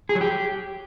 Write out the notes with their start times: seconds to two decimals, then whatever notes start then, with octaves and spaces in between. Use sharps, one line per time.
0.09 G#4
0.15 F#3
0.21 G4